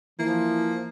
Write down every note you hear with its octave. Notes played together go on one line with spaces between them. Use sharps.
E3 F3 A#3